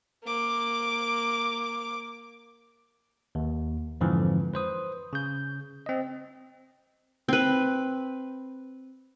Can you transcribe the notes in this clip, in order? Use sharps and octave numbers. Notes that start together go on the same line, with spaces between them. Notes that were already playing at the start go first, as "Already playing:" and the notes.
A#3 D6
D#2
F2 G#2 D3 E3 F3
B4 C5 D#6
C#3 G6
C4 D#5
C4 B4